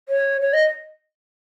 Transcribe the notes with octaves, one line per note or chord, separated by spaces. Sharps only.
C#5
C#5
D#5